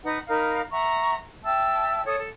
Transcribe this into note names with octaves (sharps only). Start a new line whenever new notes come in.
D#4 B4 F#5
D#4 A#4 F5 B5
E5 F#5 A#5 C#6
E5 G5 A5 E6
A4 C#5 D#6
A4